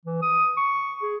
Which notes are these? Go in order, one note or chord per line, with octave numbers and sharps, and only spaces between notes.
E3
D#6
C#6
G#4